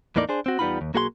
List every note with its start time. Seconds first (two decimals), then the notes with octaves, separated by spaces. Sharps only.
0.16 E2 A2 A#3 D#4 D5
0.29 D4 G#4 C5
0.46 C4 F#4
0.59 E2 G3 B3 D#4 F4 B5
0.81 D#2
0.94 B1 A#3 F#4 G#4 F#5 C6